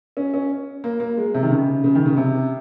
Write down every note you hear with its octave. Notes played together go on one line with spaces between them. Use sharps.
C#4
C#4
A#3
A#3
G#3
C3
D#3
C#3
C#3
D#3
C#3
C3